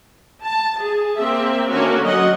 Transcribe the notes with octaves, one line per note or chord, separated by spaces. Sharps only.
A5
G#4
A#3 C4 E5
D3 A#3 C#4 F#4 C#5
F#3 D#5 F#5